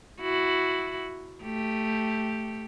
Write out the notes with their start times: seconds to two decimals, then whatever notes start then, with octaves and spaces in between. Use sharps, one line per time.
0.21 E4 F#4
1.43 A3 G4